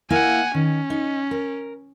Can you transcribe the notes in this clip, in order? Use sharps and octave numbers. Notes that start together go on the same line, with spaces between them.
A#3 E4 F5 F#5 G#5
D#3 C#4
D#4
A#4